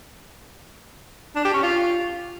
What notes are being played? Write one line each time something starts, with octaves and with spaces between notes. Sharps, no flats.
D4
G4
C#4
F4